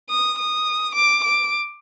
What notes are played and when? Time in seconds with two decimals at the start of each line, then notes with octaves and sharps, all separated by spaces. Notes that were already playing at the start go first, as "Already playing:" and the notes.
0.09 D#6
0.39 D#6
0.95 D6
1.24 D6